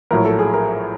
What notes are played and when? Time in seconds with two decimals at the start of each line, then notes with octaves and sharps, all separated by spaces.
0.11 A#1 A2 F#3 A#4
0.25 A4
0.39 G#4
0.54 A#4